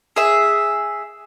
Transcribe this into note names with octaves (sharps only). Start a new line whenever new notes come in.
G#4 E5